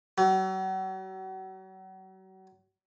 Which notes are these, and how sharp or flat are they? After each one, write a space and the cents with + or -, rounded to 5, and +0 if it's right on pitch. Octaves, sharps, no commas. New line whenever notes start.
F#3 +35